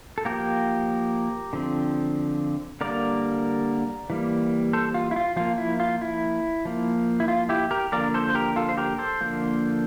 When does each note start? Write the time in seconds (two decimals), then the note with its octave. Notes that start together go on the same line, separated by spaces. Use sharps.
0.18 A4
0.25 F3 A#3 G4 A#4
1.53 D3 F3 C4
2.81 D3 G3 A#3 A#4 D5
4.10 E3 G3 A#3
4.73 A4 C5
4.94 F4
5.11 E4
5.16 F4
5.36 F3 A#3 F4
5.58 E4
5.80 F4
6.01 E4
6.65 F3 A#3
7.20 E4
7.28 F4
7.49 E4 G4
7.71 G4 A#4
7.92 D3 F3 A#3 A#4 D5
8.14 A4 C5
8.29 C5
8.35 G4 A#4
8.56 F4 A4
8.69 C5
8.78 G4 A#4
8.98 A4 C5
9.21 D3 F3 A#3